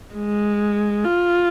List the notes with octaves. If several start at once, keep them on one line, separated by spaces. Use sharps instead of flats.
G#3
F4